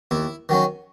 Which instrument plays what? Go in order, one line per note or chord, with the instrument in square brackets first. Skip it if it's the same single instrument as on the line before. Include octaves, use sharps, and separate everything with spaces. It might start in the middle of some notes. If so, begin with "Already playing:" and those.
[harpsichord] D#2 E4
D#3 F#3 C#4